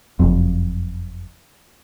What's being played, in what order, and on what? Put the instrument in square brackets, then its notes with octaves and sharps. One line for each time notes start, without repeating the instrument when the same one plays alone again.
[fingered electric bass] F#1 F2